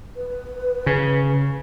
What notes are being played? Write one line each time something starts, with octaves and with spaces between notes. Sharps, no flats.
B4
C#3